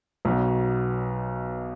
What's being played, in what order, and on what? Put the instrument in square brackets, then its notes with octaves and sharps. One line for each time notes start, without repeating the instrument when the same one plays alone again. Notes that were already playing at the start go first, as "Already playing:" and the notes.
[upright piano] B1 B2 F#3 B3